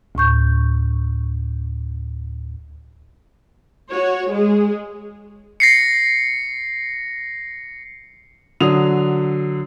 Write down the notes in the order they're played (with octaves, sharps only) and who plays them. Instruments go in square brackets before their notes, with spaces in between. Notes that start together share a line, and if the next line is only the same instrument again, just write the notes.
[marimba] D2 A2 C#6 G6
[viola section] F#4 C#5
G#3 G#4
[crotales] A#6 C7 C#7
[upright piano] D3 F#3 D#6 F7